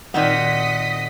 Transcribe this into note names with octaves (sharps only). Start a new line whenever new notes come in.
A#2 D#3 C4 D#5 F#5 D#6 B6